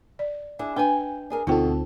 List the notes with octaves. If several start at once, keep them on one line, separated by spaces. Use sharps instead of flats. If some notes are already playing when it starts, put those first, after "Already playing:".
D5
D4 E4 G#4
D4 B4 G5 G#5
D4 G#4 A#4
D2 B2 C4 D#4 F4 A4 G5